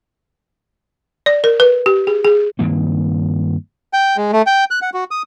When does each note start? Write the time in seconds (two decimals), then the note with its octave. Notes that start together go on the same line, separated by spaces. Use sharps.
1.26 D5
1.44 A#4
1.60 B4
1.86 G4
2.07 G#4
2.25 G#4
2.59 G2 D#3 A#3 C4
3.93 G5
4.17 G#3
4.33 A3
4.47 G5
4.71 F#6
4.82 F#5
4.94 F#4
5.11 D#6